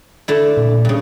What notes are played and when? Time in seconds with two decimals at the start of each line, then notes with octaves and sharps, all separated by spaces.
0.28 D3 A3 E4
0.57 A#2
0.85 G2 C#3